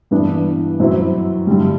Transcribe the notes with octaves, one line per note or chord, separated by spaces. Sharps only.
G2 E3 B3 D4
F#2 F#3 C4 E4
G2 D3 G3